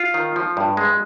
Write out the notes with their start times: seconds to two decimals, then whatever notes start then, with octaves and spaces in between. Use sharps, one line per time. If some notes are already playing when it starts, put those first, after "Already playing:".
Already playing: F4
0.14 D#3
0.36 F3
0.57 G2
0.77 G#3